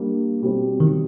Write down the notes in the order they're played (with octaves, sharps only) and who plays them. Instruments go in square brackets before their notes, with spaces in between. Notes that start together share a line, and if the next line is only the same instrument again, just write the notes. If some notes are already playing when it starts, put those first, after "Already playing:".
Already playing: [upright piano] G3 A#3 D4
B2 G3 C4
[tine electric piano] D#3